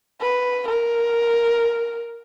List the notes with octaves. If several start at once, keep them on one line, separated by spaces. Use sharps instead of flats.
B4
A#4